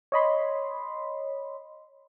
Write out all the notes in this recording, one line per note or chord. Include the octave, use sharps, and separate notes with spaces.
C#5 D#5 B5 C6